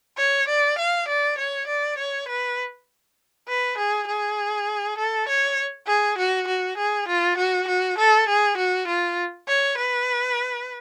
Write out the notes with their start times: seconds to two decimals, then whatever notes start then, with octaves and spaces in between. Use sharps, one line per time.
0.17 C#5
0.48 D5
0.78 F5
1.08 D5
1.38 C#5
1.67 D5
1.98 C#5
2.28 B4
3.48 B4
3.77 G#4
4.07 G#4
4.98 A4
5.28 C#5
5.87 G#4
6.18 F#4
6.48 F#4
6.77 G#4
7.08 F4
7.37 F#4
7.68 F#4
7.98 A4
8.28 G#4
8.57 F#4
8.87 F4
9.48 C#5
9.78 B4